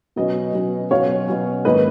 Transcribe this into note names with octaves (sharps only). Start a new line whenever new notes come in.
B2 F#3 C#4 B4 D#5
B2 F#3 C#4
B2 F#3 C#4 C#5 F5
B2 F#3 C#4
G#2 D#3 A#3 D#4 B4 D#5